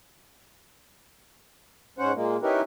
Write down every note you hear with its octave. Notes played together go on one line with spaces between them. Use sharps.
G#2 C#4 C5 F#5
A#2 G#3 A#3
C#4 D#4 E4 G4 A#4 B4